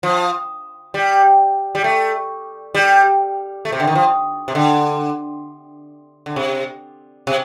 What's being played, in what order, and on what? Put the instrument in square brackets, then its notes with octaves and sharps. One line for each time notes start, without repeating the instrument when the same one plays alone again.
[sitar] F3
G3
G3
A3
G3
A3
C3
D3
D#3
F3
C3
D3
D3
C3
C3